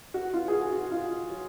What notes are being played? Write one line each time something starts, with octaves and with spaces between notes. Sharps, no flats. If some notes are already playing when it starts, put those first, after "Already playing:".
F#4
F4
G#4
F#4
F#4
F4
F#3